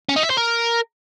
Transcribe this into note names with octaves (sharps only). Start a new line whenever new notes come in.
C#4
D#4
E5
C5
A#4